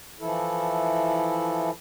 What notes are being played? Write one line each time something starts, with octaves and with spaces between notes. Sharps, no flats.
E3 F3 E4 A4